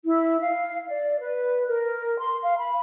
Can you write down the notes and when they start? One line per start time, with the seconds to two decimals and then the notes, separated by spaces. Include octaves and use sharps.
0.04 E4
0.41 F5
0.87 D5
1.19 B4
1.67 A#4
2.19 C6
2.42 F5
2.57 B5